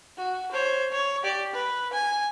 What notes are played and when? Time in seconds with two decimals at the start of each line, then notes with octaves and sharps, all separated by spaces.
0.18 F#4
0.51 C5 C#5
0.92 C#5
1.23 G4 D5
1.54 B4
1.93 G#5